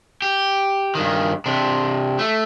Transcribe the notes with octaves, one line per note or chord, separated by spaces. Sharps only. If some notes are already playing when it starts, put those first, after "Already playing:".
G4
G2 D#3
C3 D4
A3